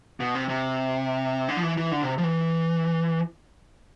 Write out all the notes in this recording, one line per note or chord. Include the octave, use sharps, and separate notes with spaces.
B2
C3
C3
D3
F3
E3
E3
D3
C3
F3
E3